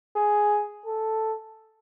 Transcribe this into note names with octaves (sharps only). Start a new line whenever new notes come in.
G#4
A4